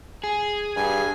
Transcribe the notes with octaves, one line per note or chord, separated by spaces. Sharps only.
G#4
G2 G#5